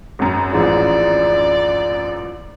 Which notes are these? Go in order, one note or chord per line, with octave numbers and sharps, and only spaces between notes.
G#1 F#2
A1 F3 G#4 D5